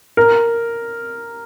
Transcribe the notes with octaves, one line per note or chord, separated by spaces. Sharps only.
A#4